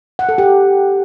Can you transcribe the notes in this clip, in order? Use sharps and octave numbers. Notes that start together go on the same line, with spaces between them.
F#5
A4
G4